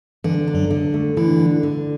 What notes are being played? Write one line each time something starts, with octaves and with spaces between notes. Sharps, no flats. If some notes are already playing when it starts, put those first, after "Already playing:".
D3 E3
D4
F#2 F#3
D3
A3
D3 E3 E4
D4
D3